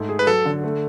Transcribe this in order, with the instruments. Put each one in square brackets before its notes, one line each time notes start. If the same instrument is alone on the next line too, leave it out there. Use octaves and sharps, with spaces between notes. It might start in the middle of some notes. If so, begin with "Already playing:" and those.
Already playing: [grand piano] G#2 A3
G#4
[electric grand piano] B4
[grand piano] F#3 [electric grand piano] A4
[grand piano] D3
A3